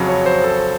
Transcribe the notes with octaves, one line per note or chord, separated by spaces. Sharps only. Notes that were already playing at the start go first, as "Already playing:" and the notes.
Already playing: F2 C#3 F#3
C#5
C5
A4